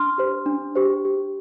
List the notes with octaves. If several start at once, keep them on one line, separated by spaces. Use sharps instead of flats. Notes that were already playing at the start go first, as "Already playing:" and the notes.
Already playing: D4 C6 F6
G4 C5
D4
G4 C5
G4